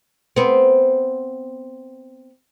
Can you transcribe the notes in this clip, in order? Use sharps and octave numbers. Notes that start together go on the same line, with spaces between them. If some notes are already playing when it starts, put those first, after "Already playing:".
B3 C4